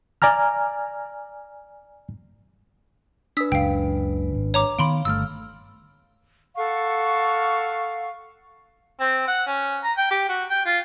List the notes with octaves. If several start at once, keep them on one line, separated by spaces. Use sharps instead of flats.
D5 G#5 A#5 F6
D4 B4 D#6 E6 B6
F#1 C#2 F5 G5
G#1
C#5 A#5 D6
D#3 B3 F5 B5 C6 D7
G1 C3 A3 E6 F6
A4 F5 F#5 C#6
C4
F#5
C#4
A#5
G5
G4
F#4
G5
F4